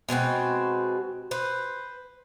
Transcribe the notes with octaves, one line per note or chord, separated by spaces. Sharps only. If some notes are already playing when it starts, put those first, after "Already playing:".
B2 G#3 C4 F#4
B4 C5